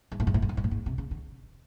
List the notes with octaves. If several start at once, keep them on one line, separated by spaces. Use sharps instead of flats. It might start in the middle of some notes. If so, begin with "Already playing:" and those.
G#2
A2
G#2
A2
G#2
A2
G#2
A2
G#2
C3
C#3
D3